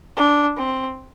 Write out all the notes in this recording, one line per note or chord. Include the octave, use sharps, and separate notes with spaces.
D4
C4